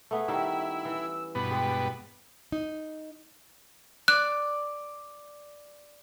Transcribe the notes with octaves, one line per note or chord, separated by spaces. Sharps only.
A3 B3 G#4 E5
D#3 G3 C#4 E4
E3 E6
G2 B2 B3 B5
G#3 G5
D#4
D5 F#6